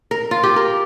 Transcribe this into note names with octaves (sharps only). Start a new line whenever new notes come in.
A#4
F4
G4
A#4